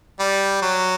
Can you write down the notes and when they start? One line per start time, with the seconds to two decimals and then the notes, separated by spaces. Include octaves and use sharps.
0.19 G3
0.62 F#3